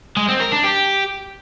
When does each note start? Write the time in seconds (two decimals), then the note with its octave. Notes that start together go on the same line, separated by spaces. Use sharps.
0.17 G#3
0.28 C4
0.40 A#4
0.52 D4
0.64 G4